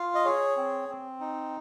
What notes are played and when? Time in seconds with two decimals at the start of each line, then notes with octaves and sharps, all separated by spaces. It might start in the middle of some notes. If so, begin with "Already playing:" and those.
Already playing: F4 F5
0.15 D#5
0.25 G#4 C#5
0.57 C4
0.89 C4
1.20 D#4